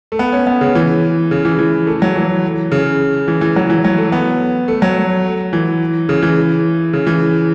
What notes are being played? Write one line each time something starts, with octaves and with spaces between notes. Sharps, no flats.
A3
B3
C#4
B3
C#3
E3
C#3
E3
E3
A3
F#3
E3
C#3
E3
E3
F#3
E3
F#3
A3
B3
A3
F#3
E3
C#3
E3
C#3
E3